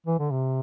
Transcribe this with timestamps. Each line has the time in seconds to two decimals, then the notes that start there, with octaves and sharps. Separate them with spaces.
0.07 E3
0.19 D3
0.31 C3